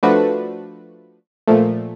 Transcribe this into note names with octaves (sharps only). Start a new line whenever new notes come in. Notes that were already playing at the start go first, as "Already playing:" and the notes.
F3 A3 D4 F#4 B4
A#2 F3 A3